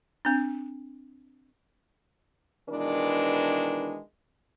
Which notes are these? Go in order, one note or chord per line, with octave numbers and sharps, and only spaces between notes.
C4 D4
B2 D#3 E3 G#3 D4 A#4